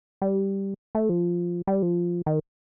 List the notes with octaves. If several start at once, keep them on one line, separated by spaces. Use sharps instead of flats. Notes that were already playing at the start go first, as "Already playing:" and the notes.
G3
A3
F3
G3
F3
D#3